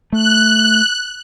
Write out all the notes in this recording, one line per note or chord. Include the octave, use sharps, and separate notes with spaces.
A3 F#6